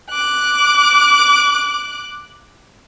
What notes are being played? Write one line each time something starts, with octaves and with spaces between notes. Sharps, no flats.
D6 F#6